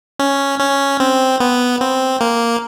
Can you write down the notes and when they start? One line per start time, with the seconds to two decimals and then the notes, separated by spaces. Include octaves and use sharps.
0.19 C#4
0.60 C#4
1.00 C4
1.40 B3
1.81 C4
2.21 A#3